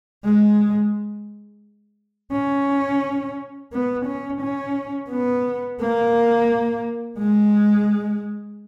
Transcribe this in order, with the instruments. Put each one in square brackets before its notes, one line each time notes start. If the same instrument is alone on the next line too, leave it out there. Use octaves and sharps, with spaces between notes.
[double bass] G#3
C#4
B3
C#4
C#4
B3
A#3
G#3